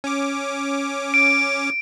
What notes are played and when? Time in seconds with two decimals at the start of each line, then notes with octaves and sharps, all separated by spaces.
0.04 C#4 D6
1.14 D7